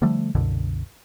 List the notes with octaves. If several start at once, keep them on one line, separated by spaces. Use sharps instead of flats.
D3 F3 G3 A3
C2 F#2 B2 D3